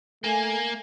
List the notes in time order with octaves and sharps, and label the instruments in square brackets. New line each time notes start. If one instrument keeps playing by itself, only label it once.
[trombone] A3 [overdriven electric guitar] A#3 [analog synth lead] G#5